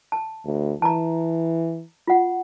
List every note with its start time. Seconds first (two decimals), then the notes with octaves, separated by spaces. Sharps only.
0.12 A5
0.45 D2
0.82 E3 A5 A#5
2.07 F4 F#5